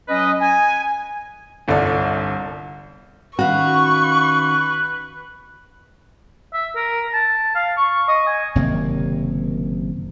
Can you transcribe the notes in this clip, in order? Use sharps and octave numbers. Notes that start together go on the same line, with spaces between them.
F#3 C#4 B4 D#5
G#5
G1 C2 A4 D5
D#3 C#4 F#4 B4 F5 C#6
E5
A#4
A5
F5
C#6
D#5
G#5
F#1 C3 D#3 A#3